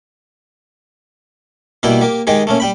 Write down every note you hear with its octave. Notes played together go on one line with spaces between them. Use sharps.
B2 G3 A#3 E4 G5
A#3 G4
G#2 D#3 D#4 G4 G#4
A3 A#3 C#4
G3 G5 B5